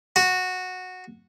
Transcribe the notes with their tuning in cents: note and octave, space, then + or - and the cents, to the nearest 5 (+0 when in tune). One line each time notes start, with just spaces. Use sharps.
F#4 -10